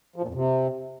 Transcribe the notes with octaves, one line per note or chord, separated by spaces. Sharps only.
F3
A#2
F2
C3